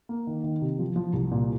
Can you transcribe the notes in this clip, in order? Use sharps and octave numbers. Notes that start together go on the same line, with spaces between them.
A#3
D#3
D#3
C3
F3
F3
C2
A#2